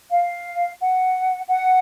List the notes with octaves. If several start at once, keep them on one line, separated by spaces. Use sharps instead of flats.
F5
F#5
F#5